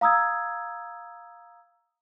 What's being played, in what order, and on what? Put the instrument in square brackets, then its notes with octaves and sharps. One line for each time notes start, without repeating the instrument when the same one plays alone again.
[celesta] F5 A#5 D#6 E6 G#6